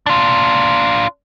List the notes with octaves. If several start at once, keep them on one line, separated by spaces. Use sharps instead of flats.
D4 F4